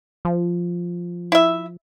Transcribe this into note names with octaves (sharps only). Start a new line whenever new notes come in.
F3
E4 E5